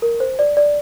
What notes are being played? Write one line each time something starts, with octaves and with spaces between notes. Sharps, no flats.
A#4
C5
D5
D5